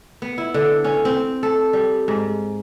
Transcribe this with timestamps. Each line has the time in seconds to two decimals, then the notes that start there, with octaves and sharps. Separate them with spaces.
0.22 B3
0.38 E4
0.54 D3
0.84 C#4
1.05 C4
1.43 A4
1.73 G3
2.08 G#2